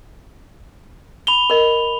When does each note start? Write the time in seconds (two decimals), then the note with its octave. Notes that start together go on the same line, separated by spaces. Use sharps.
1.27 B5 F7 G7
1.50 A#4 D#5